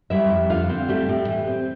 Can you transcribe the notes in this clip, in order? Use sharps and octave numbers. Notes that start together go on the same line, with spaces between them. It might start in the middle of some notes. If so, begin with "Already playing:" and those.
G3 E4 E5
F2
D3 F4 F5
C4
G3 A3 G4
A2
E3
C4